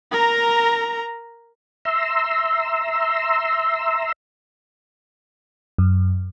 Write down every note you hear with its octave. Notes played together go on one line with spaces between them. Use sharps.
A#4 A#5
E5 A#5 C6 E6
F#2